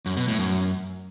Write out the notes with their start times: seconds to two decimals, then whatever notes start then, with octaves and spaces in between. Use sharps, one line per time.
0.06 F#2
0.17 B2
0.28 A2
0.39 F#2